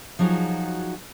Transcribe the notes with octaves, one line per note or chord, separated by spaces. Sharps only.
F3 F#3 D#4 F#4 G#4